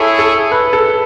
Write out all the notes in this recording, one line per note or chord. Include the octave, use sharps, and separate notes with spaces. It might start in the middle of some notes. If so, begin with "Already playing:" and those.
Already playing: E4 G#4 A4 C#5 E5
A4
B4
A4